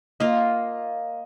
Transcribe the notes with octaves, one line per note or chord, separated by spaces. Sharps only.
A#3 F4 A#4 D#5